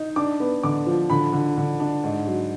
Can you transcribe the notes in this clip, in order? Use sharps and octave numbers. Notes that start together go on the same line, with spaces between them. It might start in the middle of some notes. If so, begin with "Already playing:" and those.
Already playing: D#4
D4 D6
B3
D3 D6
F3
D3 B5
D3
D3
D4
G#2
F#3